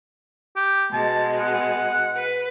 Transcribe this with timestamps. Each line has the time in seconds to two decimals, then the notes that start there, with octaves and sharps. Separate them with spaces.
0.56 G4
0.93 B2 G#3 A5
1.39 F#5
2.15 B4